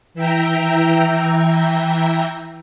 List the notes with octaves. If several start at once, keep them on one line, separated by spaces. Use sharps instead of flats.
E3 E5 G5 A#5